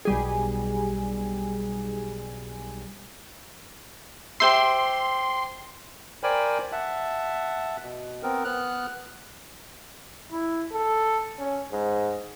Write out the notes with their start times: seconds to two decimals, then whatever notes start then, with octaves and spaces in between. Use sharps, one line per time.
0.05 B1 G3 G#4
4.40 G4 C5 E5 C6
6.23 A#4 C5 D5 G5 G#5 B5
6.72 E5 F#5 A5
7.82 B2
8.23 B3 C4 A#4
8.45 B3 F6 F#6
10.32 E4
10.73 A4
11.39 C#4
11.72 G#2